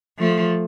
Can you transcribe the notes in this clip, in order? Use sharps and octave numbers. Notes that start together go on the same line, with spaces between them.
F3 A3